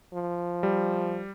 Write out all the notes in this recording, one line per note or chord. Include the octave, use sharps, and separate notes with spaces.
F3
G3